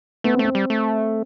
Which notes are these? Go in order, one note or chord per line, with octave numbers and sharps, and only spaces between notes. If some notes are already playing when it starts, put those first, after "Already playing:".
A3 B3
C4
A3
C4
G3
A3